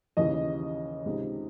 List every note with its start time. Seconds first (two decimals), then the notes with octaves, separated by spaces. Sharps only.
0.17 D#2 C#3 E3 D#5
1.06 C#2 C3 D#3